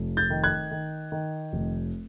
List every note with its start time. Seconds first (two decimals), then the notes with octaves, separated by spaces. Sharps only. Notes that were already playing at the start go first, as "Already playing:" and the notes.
Already playing: F1
0.17 G6 A6
0.30 D#3
0.44 F#6 G#6
0.71 D#3
1.12 D#3
1.53 F1